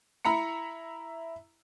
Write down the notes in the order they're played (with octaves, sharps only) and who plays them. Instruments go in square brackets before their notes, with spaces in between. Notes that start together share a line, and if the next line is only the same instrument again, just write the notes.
[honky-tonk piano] E4 E5 A#5 B5 C#7